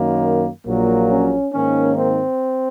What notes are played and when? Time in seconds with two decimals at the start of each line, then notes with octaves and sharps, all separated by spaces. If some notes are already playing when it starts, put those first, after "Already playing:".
Already playing: F#2 D#3 A#3
0.65 A#1 A#2 F#3 A#3
1.10 C#4
1.53 G#2 D#3 A#3 C#4
1.97 C4